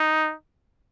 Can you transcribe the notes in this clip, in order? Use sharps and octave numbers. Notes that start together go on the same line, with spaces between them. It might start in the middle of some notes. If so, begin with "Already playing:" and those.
Already playing: D#4